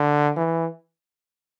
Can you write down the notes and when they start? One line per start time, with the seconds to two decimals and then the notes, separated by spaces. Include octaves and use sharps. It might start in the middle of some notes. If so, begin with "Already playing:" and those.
Already playing: D3
0.36 E3